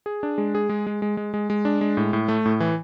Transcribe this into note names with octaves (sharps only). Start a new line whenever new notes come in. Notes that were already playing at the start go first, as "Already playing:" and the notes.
G#4
D4
G#3
G#4
G#3
G#3
G#3
G#3
G#3
G#3
D4
G#3
A2
A2
A3
A2
E3